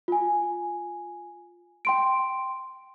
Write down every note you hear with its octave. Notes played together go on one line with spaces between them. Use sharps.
F4 G#5
G5 C6 D7